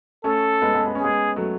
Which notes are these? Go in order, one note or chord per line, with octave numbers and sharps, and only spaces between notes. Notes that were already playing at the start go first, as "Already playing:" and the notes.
A3 C#4 A4
G#3 B3
G#3 B3
B3
C#4 G#4
G#3 B3
F#3 A3